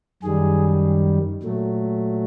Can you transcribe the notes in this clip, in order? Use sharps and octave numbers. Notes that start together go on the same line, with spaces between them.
F#2 D#3 G3 G#4
A#2 F#3 A3